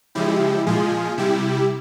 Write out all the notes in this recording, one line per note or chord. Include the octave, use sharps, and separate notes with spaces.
C#3 F3 G#3 E4 G4
A#2 F3 G#3 F4 G#4
C3 G3 E4 G4